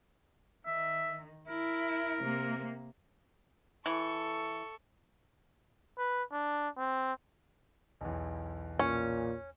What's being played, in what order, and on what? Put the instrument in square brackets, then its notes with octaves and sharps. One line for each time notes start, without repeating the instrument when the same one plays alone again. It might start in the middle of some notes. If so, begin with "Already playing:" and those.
[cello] D#3 [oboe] E5
[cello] E4 [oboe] A#4
[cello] C3 A#3
[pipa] E3 [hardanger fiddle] A4 C#6
[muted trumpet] B4
D4
C4
[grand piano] B1 E2
[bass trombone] A#2 [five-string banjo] C#4